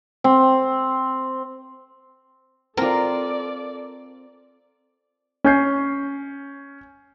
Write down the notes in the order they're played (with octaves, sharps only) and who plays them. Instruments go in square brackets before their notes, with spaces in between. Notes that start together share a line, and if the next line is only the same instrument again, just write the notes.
[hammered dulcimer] C4
[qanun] C4 F4 [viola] A4 D5 [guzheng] A#4
[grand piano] C#4 G#5 G6 C7